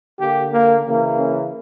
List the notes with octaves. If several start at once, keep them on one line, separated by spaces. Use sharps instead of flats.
D3 A#3 G4
A#3
C#3 E3 A#3
C#4